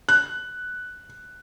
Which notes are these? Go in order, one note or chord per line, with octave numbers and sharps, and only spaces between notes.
F#6